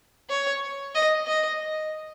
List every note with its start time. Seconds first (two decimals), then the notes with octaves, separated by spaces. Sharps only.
0.30 C#5
0.95 D#5
1.27 D#5